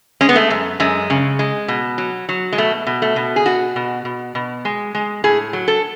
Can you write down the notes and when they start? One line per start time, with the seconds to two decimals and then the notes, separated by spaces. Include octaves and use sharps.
0.21 G#3 C#4
0.29 B3
0.36 A3
0.50 F#2
0.80 F#2 G#3
1.10 C#3
1.39 G#3
1.68 B2
1.98 F#3
2.29 F#3
2.52 G#3
2.58 B2 A3
2.87 B2
3.02 A3
3.16 B2
3.36 G#4
3.46 B2 F#4
3.76 B2
4.05 B2
4.35 B2
4.65 G#3
4.95 G#3
5.24 A2 G#4
5.53 F#3
5.68 A4